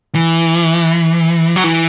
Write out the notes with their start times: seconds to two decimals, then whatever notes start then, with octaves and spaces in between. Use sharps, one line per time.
0.15 E3
1.56 F#3
1.64 E3